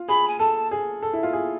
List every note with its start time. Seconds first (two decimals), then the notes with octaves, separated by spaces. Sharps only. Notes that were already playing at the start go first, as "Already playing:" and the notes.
Already playing: F4
0.08 G#4 B5
0.28 G#5
0.39 A4 A5
0.71 G#4
1.02 A4
1.13 E4
1.23 F4
1.33 G#4